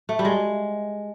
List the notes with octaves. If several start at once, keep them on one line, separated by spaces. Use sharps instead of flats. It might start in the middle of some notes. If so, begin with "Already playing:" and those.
A3
G3
G#3